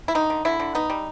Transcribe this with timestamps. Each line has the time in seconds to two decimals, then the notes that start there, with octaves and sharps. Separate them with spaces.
0.08 E4
0.15 D3 D#4
0.30 D3
0.45 D3 E4
0.60 D3
0.75 B3 D#4
0.90 G3